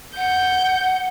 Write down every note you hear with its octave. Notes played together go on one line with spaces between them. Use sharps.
F#5 G6